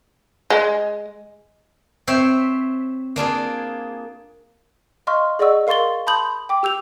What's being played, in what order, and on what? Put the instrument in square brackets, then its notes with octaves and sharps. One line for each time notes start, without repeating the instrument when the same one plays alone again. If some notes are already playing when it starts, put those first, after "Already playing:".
[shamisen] G#3
[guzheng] C4 C5 C#5 E5
A#3 D4 F4 G#4
[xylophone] D#5 F5 C6 C#6 F6
G#4 D5 D#5 F#5 C#6 E6
A#4 F5 C6 C#6 A6 G7
A5 B5 C6 D#6 G6 F#7
G5 D6
G4 E6 G6 F7